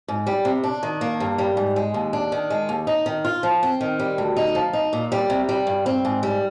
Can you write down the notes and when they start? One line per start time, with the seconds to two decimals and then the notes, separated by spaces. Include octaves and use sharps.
0.08 G#2
0.27 G3
0.45 C3
0.64 D4
0.83 D#3
1.01 A#3
1.20 G2
1.38 G3
1.57 G#2
1.76 G#3
1.94 D#2
2.13 D4
2.32 D#3
2.50 G#3
2.69 D#2
2.87 D#4
3.06 D#3
3.25 F4
3.43 F3
3.63 C4
3.81 D#3
4.00 G3
4.18 D2
4.37 D#4
4.55 F3
4.73 D#4
4.93 A#2
5.12 G3
5.30 C3
5.49 G3
5.67 G2
5.86 C4
6.05 G#2
6.23 G3